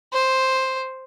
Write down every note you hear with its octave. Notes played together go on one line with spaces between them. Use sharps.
C5